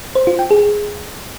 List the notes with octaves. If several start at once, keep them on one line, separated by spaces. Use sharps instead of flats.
C5
F4
G5
G#4